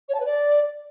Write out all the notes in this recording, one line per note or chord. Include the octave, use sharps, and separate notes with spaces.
C#5
A5
B4
D5